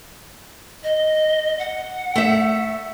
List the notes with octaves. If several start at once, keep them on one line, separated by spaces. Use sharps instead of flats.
D#5
F#5
A3 E5